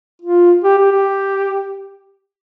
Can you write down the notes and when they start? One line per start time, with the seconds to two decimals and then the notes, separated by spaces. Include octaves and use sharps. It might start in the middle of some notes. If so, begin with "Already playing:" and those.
0.22 F4
0.64 G4
0.79 G4
0.92 G4